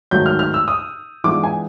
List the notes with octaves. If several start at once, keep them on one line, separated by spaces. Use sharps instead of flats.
G#2 D#3 F#3 A3 G6
F6
F6
E6
D#6
E3 G#3 B3 D4 F4 D6
G#5